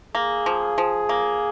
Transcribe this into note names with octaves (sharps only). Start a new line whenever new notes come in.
A#3 G#4
F3
F3
A#3